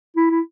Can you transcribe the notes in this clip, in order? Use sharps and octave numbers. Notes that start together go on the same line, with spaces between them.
E4
E4